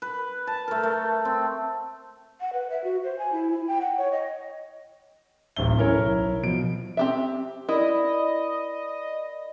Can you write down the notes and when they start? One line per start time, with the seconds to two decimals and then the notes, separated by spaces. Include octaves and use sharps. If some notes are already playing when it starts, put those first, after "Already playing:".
0.02 B4
0.47 A5
0.68 A3 A#4
0.83 A3
1.25 C4
2.41 F#5
2.53 B4
2.70 E5
2.84 F#4
3.04 C5
3.19 G#5
3.32 E4
3.51 E4
3.67 G5
3.81 F#5
3.97 C#5
4.12 D#5
5.56 D1 A1 E5 G7
5.78 C#4 E4 A4 A#4 C#5
5.98 B1
6.44 B2 F3 D7
6.97 C4 G4 E5
7.69 E4 A#4 D5 D#5 B5